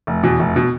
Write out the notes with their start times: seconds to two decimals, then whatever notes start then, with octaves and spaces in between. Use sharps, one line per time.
0.07 F1
0.23 E2 B2
0.39 F1
0.56 B2